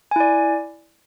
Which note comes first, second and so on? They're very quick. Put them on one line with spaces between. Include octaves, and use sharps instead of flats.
G#5 E4 D5